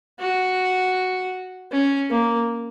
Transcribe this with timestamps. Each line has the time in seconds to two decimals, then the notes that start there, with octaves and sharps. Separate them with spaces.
0.20 F#4
1.72 C#4
2.10 A#3